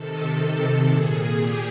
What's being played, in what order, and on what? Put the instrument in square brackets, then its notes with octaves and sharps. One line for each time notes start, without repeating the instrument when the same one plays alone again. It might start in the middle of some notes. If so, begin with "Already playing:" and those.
Already playing: [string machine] C3 D#3 A4
A#2 G#4
G4